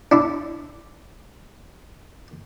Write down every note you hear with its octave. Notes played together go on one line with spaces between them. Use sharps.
D4 E4